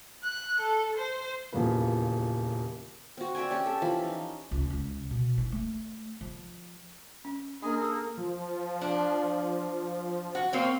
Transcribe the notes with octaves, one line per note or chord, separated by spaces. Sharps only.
F#6
A4
C5
D#1 E2 C#3 F3 A#3 B4
C4 F#4
D5 E5 G5 G#5
C#4 G4
A4 E5
E3 F3 B5
D#4
C#2
C#2
B2
E4
A3
F3
C#4
A#3 D4 G#4 D#5 G#5
G#4 A4
F3
D4
F#4
A#3 C4 C#5